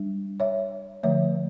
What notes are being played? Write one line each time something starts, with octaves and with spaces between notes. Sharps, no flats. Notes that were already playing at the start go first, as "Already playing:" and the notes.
Already playing: G3 D4
C#5 E5
D3 F3 A3 C#5 E5